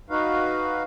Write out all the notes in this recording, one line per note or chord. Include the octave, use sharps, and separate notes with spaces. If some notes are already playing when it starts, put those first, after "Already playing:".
D#4 F#4 B4 F5